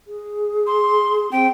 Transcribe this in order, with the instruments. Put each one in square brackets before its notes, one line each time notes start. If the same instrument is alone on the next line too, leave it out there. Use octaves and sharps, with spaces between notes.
[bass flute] G#4
[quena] C6
[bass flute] C4 [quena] G5